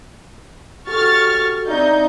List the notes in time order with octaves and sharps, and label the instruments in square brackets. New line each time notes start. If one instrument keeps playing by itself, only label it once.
[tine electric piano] F#4 G4 A4 [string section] C#6 F6 A6
[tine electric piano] C4 D5 E5 [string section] D#4 G6